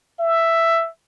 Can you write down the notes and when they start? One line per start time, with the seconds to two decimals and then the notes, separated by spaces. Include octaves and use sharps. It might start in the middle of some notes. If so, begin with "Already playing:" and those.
0.19 E5